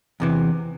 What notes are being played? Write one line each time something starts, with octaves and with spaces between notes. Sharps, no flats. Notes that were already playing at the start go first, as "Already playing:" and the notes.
E2 C3 E3